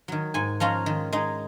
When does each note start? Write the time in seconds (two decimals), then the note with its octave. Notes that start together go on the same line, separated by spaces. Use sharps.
0.08 D#3 F#3
0.34 G#2 G#5
0.60 F3 G#3 C#4 F4 A#5
0.86 D#3
1.13 G#3 D#4